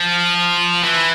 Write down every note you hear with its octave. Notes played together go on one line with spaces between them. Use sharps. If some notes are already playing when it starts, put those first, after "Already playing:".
Already playing: F3
E3